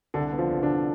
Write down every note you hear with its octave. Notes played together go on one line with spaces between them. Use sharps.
C2 D3 D4
B3
F3 F4
C2
D3 D4
C2